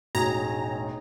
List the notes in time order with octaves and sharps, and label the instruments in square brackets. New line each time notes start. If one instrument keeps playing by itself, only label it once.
[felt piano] E1 A1 [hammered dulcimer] D#4 G#4 [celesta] F#4 G#6 [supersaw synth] A#5